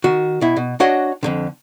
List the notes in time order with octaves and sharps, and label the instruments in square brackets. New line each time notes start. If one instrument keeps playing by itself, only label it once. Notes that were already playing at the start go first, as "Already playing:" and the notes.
[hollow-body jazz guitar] D#3 F#4
B2 E4
B2
D4 F#4 C#5 D#5 F#5
F2 G#2 D3